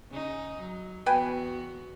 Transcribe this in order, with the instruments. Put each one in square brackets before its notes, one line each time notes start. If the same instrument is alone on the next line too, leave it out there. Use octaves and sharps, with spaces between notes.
[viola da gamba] C#3 D#4
F#3
[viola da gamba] E2 B3 F#4 [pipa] B4 G5 G#5